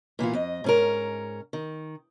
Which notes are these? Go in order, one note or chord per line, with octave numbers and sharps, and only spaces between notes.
A#2 E3 B3 F4
F2 D#5
G#2 C#4 A#4
D#3